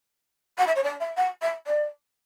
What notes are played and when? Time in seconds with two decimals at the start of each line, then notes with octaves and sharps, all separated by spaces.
0.57 F#5
0.66 E5
0.75 C#5
0.83 D5
1.00 E5
1.16 F#5
1.41 E5
1.66 D5